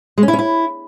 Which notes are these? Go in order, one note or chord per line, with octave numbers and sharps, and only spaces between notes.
G#3
C#4
E4
C#4
E4